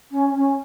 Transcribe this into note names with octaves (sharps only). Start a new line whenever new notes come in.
C#4
C#4